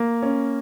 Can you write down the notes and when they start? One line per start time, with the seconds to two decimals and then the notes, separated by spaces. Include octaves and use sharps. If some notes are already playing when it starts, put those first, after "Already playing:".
Already playing: A#3
0.22 C#4